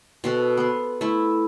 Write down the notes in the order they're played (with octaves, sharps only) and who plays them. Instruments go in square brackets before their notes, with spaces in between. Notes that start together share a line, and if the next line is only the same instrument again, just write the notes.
[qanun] B2 F#4 A4
B3 C6
A3 E4